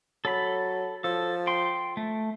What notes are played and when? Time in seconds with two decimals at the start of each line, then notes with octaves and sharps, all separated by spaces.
0.25 F#3 A4 B5
1.04 F3 A4
1.47 G5 C6
1.97 A3